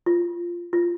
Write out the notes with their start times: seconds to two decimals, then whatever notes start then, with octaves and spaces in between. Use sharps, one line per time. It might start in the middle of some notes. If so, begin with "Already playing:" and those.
0.06 F4
0.73 F4